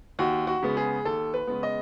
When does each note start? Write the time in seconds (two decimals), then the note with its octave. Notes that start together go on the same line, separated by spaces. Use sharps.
0.19 D#2 F#4
0.47 F#4
0.63 C#3 G#3 B3
0.77 G#4
1.05 D#2 A4
1.34 B4
1.47 C#3 G#3 B3
1.63 D#5